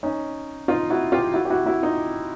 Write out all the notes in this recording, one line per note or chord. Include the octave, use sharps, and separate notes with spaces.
C#4 D#4
D#4 F4
E4 F#4
F4 G4
E4 F#4
G4
E4 F#4
E4 F#4
D#4 F4